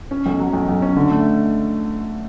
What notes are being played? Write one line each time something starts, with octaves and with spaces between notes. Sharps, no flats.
C#4
B1
F#3
B1
B1
C#4
D3
A3